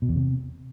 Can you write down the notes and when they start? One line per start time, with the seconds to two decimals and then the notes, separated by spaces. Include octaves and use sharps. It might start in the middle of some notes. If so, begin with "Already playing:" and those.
0.02 B2
0.09 E2
0.16 C3